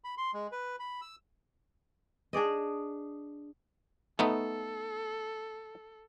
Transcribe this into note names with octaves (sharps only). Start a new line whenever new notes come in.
B5
C6
G#3
B4
B5
E6
D4 G#4 D5 D#5
A3 B3 D#4 A4